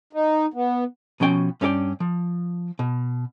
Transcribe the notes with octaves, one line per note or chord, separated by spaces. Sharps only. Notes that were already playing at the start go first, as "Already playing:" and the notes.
D#4
B3
B2 F3 C#4 G5
G2 C#4 D#4 A4 D5 G5
F3
B2